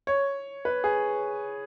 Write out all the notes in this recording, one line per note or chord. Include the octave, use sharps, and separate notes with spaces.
C#5
B4
G#4